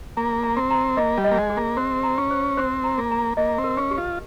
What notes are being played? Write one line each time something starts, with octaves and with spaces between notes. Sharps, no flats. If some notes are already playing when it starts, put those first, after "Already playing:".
A#3 A#5
A#5
C4
A#5
A#3 D#5
G3
D#5
A#3
G#3
G#4
A#3
C4 C5
A#5
C#4
C5
C4 C5
A#5
A#3
A#5
A#3 D#5
C4
A#4
C#4
G4
F4